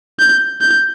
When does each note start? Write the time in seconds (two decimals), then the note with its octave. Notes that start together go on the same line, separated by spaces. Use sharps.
0.19 G6
0.61 G6